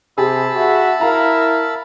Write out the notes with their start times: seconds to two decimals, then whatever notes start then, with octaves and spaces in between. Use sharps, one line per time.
0.18 C3 G4 G#4 A5 B5 E6
0.56 F#4 E5
1.01 E4 A#4 F5 A#5